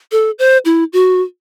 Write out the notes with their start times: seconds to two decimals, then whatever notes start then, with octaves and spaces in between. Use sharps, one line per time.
0.12 A4
0.39 C5
0.65 E4
0.93 F#4